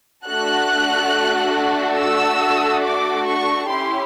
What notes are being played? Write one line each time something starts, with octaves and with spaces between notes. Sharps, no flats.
A3 D4 F#4 A4 F#6
E6
D6
C#6
C#4 E4 G4 C6